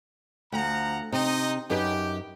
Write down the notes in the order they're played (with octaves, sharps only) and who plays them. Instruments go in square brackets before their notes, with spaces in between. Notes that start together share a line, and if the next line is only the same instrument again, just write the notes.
[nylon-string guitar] D2 [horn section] F3 F#5 A#5
[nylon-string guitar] C3 [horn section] D#4 D#5
[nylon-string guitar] F#2 D#4 B4 [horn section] G4